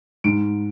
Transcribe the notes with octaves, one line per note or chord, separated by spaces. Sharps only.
G#2 D7